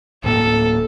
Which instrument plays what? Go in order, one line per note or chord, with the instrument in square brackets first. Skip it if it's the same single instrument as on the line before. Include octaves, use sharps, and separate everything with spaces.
[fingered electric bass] D1 A2 A#3 [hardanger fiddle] A4